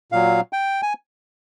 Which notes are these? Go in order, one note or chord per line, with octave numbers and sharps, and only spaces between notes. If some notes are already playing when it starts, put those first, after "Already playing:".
A#2 F#3 F5
G5
G#5